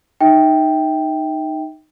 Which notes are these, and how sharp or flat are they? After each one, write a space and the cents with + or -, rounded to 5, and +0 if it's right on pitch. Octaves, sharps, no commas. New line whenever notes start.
D#4 -10 E5 -30 G5 +0